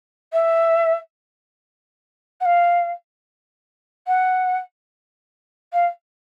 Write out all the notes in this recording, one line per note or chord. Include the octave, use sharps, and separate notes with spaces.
E5
F#5
F5
F#5
F5